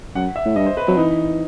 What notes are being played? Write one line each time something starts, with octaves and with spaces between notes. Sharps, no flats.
F#2 F#5
E5
A2
G2 D#5
C5
B4
F#3 C4
E3 D#4